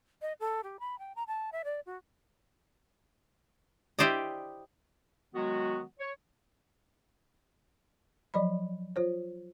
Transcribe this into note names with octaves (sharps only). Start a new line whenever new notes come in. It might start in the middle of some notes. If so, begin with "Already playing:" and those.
D#5
A4
G4
B5
G5
A#5
A5
E5
D5
F#4
E4 G4 C5 D5 D#5
D#3 F#3 G#3 B3 F#4
C#5
F3 F#3 D5 D#5 B5
F4 C5 C#5